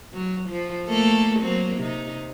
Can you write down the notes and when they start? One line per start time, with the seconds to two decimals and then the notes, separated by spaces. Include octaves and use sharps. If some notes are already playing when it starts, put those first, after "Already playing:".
0.13 F#3
0.49 F3
0.87 A3 A#3 A4
1.40 F#3 A#3 C4
1.78 C3 D#4